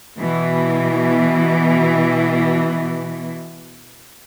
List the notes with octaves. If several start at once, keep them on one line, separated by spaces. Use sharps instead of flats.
B2 E3